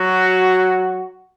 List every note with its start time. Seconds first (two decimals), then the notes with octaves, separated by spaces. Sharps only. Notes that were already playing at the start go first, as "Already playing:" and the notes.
Already playing: F#3 F#4